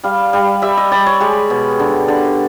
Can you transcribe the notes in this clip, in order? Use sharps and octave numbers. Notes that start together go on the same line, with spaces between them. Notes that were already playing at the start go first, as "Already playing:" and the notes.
G3 F5
G3
G3 E5
D#5
G3 D5
C#5
G#3 G4
B2
D3
D3